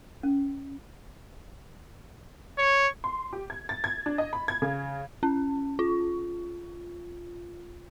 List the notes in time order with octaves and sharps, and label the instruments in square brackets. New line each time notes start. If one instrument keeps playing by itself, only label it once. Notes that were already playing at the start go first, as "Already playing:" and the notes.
[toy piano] C#4
[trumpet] C#5
[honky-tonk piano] C6
G4
G#6
A6
G#6
D4
D#5
B5
G#6
C#3
[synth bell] C#4
F4